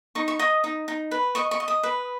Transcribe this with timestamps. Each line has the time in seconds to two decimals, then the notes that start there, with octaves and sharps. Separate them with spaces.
0.15 D#4 C#6
0.28 C#6
0.39 D#5 D#6
0.64 D#4
0.88 D#4
1.11 B4
1.35 D#5 C#6
1.51 C#6
1.60 D#5
1.68 D#6
1.83 B4